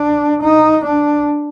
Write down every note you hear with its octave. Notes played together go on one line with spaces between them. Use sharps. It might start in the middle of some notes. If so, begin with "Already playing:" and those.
Already playing: D4
D#4
D4